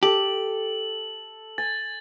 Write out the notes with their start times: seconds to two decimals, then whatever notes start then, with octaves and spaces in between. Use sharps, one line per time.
0.03 G4 A4 F#7
1.58 G#5 A6